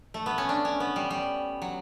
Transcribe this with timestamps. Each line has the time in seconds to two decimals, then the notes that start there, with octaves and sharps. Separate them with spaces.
0.14 A3
0.26 B3
0.38 C#4
0.49 D4
0.65 C#4
0.80 B3
0.96 G3
1.10 G3
1.62 F#3